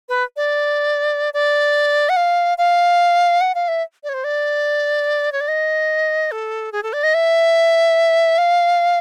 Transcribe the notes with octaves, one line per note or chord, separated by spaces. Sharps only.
B4
D5
D5
F#5
F5
F5
F#5
F5
E5
D5
C#5
C5
D5
C#5
D5
D#5
A4
G#4
A4
D5
D#5
E5
F5